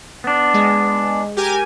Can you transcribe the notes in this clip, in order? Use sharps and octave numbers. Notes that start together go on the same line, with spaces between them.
B3 D4
G#3
G4 A#4 G#5